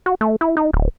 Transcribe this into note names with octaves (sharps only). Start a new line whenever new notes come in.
F#4
A3
E4
D#4
D1